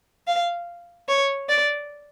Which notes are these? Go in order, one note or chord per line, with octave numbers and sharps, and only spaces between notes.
F5
C#5
D5